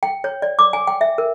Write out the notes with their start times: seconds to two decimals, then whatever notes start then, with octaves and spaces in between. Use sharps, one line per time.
0.03 G5
0.24 C#5
0.42 D5
0.59 D6
0.73 G#5
0.87 G5
1.01 E5
1.18 A#4